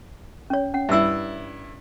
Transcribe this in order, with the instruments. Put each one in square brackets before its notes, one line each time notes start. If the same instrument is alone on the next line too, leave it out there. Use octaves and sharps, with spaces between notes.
[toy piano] C#4 C#5
C#4 F#5
[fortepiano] G2 E4 [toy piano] E5 E6